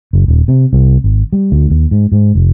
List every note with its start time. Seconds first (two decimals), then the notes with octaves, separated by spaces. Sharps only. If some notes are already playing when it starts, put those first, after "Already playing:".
0.13 F#1
0.28 D#1
0.48 C3
0.73 C2
1.04 G#1
1.33 G3
1.52 D2
1.70 D#2
1.91 G#2
2.12 G#2
2.35 F1